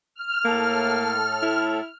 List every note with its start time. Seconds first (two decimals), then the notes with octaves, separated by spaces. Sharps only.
0.15 F6
0.45 A2 A#3 A4
1.43 E4